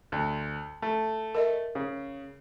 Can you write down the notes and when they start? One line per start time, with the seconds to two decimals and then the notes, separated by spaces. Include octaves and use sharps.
0.12 D2
0.82 A3
1.35 A#4 D#5 E5
1.75 C#3